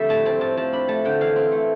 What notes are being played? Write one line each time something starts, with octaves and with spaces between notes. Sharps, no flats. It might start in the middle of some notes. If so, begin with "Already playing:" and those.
Already playing: F2 D3 G3 A3 E5
A2 A5
C4 A5
A2 A5
F3 A5
D4 B5
A3 A5
D3 G5
E3 F5
C4
A3